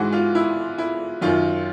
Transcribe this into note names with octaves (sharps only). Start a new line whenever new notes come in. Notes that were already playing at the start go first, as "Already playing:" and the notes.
Already playing: G#2 E3 G#3 F#4
F4
E4
E4
F#2 D#3 F#3 F4